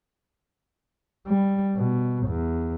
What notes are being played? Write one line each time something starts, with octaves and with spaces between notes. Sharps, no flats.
G3
B2
E2